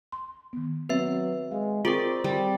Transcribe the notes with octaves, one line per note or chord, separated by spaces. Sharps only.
C6
D#3 B3
F#3 B3 C4 B4 E5
G#3 F5
C4 F4 G#4 A#4 D5
G3